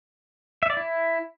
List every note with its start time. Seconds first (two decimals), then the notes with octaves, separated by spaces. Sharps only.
0.63 E5
0.70 D5
0.77 E4